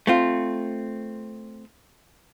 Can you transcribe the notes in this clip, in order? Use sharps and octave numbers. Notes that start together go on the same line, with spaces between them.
A3 C4 F4